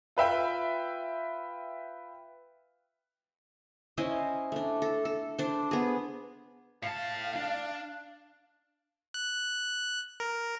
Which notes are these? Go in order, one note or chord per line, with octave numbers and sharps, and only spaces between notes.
F4 B4 E5 G5 B5
C#4 E4 C5 D#5
A3 D4
A4
A4
D4 C5
B3 G#4
A2 F5 A5
D4
F#6
A#4